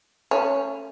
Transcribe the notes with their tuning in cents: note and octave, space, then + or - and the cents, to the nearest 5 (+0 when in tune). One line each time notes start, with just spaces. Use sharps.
A3 +25 C#4 +0